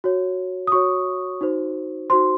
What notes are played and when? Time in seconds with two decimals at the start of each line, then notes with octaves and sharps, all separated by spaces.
0.04 F#4 C#5
0.67 D#6
0.72 F#4 C#5 C#6
1.41 D#4 F#4 C5
2.10 D#4 F#4 C5 C6